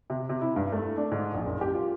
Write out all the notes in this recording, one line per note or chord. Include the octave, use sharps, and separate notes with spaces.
C3
C3
E4
G2
A3
D4
G#2
A#1
F#1
G4
F4